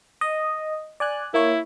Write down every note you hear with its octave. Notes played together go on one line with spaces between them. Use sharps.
D#5
D5 G#5 F#6
A#3 E4 C#5